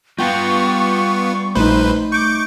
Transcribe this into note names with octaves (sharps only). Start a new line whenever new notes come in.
G3 B3 F4 G5 A5 C#6 G6
A#1 A3 D#4 B4 C5
C#6 D6 G6